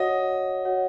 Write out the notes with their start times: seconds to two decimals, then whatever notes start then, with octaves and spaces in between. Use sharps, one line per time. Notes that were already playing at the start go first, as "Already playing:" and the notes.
Already playing: F#4 C#5 D#5 F#5
0.65 F#4 C#5 F#5